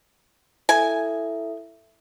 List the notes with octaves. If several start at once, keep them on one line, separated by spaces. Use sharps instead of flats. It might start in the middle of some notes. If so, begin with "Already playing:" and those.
E4 A4 E5 G#5